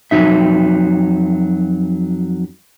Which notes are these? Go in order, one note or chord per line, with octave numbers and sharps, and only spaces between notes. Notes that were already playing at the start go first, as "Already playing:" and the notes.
F2 F3 F#3 D#4 E5